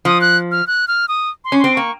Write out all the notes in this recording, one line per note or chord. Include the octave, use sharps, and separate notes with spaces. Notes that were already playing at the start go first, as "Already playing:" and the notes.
F3 D#6
F#6
F6
F#6
F6
D#6
C6
C#4
C4 C6
A#3 C#6